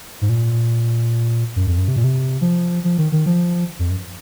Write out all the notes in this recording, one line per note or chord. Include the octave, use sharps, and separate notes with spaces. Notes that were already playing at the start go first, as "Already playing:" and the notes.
G#2
A#2
F#2
F2
F#2
C3
A#2
C3
F3
F3
D#3
D#3
F3
F2
F#2